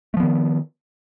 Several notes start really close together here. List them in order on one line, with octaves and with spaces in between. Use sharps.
A3 F3 B3 D#3